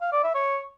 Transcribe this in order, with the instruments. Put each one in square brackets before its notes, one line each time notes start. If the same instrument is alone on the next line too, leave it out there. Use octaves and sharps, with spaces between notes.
[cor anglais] F5
D5
E5
C#5